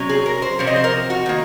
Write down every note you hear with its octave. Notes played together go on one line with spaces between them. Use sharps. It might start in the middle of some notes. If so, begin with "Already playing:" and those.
Already playing: C3 F#3 C#4
G#4
A#4
C5
C3 F3 C4 C#5
D#5
C5
A#4
F#4
D#3 A#3